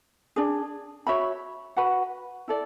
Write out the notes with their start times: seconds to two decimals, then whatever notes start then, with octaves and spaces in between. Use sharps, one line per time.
0.36 D4 G#4 D5
1.07 F#4 C#5 E5 B5
1.77 F#4 B4 F#5 B5
2.48 E4 A4 D5